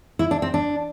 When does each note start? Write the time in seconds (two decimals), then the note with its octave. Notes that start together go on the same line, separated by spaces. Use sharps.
0.19 E4
0.31 D4
0.42 C4
0.54 D4